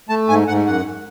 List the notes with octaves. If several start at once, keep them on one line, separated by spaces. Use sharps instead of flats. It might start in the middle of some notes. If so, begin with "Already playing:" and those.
A3 A5
G#2 G#5
G#2 F#5
F#2 F#5